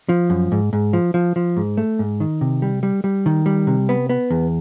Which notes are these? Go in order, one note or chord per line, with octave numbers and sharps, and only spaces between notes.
F3
F#2
G#2
G#2
F3
F3
F3
G#2
A3
G#2
D#3
C3
G3
G3
G3
D#3
G3
C3
B3
B3
E2